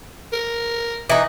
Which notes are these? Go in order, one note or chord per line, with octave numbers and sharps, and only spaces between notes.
A#4
E3 D#4